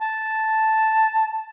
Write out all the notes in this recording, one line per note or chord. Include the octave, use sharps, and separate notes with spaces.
A5